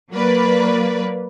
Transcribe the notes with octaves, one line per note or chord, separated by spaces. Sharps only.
F#3 A#3 B4 D5